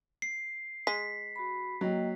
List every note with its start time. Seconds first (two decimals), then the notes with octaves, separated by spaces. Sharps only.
0.22 C7
0.87 G#3 B6
1.36 F#4 B5
1.81 F#3 A#3 D#5 G5